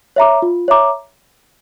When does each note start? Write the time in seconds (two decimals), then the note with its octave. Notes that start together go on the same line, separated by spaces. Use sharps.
0.16 C#5 E5 A#5 D6
0.42 F4
0.68 C#5 E5 A#5 D6